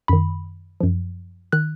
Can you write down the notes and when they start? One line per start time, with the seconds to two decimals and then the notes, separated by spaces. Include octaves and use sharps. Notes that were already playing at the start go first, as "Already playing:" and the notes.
0.08 F#2 D#3 B5
0.80 F#2 F3
1.52 D#3 F#6